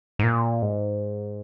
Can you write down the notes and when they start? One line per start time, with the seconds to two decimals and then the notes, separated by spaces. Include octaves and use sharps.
0.19 G#2
0.23 A#2
0.62 G#2